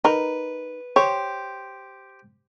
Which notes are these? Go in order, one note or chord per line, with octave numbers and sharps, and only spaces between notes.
D#4 A#4 B4
G4 C5 C#5